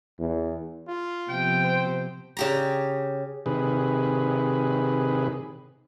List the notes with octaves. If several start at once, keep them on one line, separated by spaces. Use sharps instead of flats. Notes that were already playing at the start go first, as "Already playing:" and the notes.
E2
F4
C3 F3 B3 G5
C5
C#3 G4 A#5
C3 D#3 G#4 B4